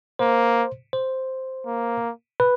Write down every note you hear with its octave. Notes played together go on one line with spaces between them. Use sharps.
A#3 C5
C5
A#3
B4